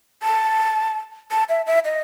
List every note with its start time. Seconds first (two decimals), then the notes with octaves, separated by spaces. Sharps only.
0.23 A5
1.31 A5
1.49 E5
1.67 E5
1.85 D#5